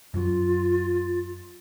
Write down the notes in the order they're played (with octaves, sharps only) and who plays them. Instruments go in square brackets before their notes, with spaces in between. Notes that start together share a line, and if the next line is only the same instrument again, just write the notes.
[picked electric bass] F#2 F#3 [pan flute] F4